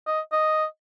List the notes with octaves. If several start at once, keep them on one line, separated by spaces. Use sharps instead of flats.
D#5
D#5